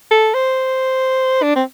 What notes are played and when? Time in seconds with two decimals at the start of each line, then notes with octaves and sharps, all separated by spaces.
0.11 A4
0.34 C5
1.43 D4
1.55 C4